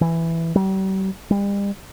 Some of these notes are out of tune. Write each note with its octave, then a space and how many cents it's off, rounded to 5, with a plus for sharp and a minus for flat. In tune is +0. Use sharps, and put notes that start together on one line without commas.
E3 +5
G3 -40
G3 +40